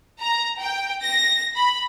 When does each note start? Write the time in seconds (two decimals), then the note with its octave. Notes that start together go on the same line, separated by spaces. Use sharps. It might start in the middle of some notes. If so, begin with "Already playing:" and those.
0.20 A#5
0.60 G5
1.04 A#6
1.56 B5